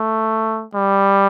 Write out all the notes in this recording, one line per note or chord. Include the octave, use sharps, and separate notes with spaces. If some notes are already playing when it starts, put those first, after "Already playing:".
Already playing: A3
G3